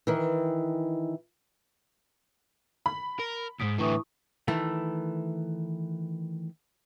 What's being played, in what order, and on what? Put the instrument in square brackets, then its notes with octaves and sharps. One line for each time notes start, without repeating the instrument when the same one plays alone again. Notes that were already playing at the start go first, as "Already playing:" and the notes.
[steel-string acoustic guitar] D#3 E3
[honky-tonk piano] B5
[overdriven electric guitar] A#4
[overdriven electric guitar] D#2 G#2 [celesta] D#6 B6 D7
[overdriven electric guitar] A2 D3 [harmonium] E3 [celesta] E4 C#6 D#6
[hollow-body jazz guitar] D#3 E3 A3